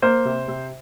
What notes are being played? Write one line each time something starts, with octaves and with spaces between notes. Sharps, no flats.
A#3 C5
C3
C3